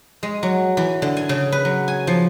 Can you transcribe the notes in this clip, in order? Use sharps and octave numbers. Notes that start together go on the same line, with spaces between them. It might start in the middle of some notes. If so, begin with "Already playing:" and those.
G#3
F#3
E3
D3
G#5
C#3
B4
F#3
G#5
F3